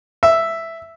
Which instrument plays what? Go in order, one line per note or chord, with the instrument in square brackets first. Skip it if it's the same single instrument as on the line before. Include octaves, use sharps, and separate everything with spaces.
[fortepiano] E5